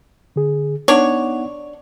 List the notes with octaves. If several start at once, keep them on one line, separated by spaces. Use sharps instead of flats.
D3 G#4
B3 D4 D#4 C#5 F#5